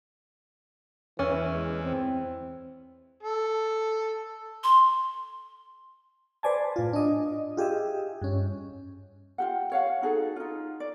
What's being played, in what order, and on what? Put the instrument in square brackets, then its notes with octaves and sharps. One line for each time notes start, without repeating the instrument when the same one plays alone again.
[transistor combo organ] E2 [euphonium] E3 [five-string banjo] C#4
[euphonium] G#3
C4
[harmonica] A4
[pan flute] C6
[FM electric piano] B4 C5 D5 G#5 A5
A2 F4
D4 D#5
F4 G4 G#4 D#5 E5
G2 C#4
[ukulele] F4 G4 F#5
C#5 F5 F#5
D#4 F#4 G#4 A4
D#4 F4
D5